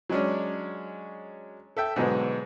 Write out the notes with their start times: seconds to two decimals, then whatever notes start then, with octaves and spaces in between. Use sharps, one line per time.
0.09 F#3 G#3 C#4 D4
1.77 A4 E5 G5
1.96 G#2 B2 D3 F#3 G#3 B3